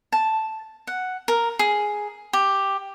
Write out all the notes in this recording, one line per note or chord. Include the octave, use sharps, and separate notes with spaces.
A5
F#5
A#4
G#4
G4